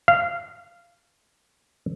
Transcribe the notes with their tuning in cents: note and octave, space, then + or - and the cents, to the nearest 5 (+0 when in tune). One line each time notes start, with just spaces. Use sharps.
F5 -15